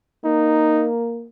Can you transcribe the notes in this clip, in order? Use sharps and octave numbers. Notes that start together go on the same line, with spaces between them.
A#3 D#4